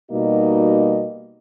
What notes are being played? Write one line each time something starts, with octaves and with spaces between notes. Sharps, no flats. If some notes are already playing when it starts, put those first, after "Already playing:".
B2 G3 A#3 D#4 F#4 D#5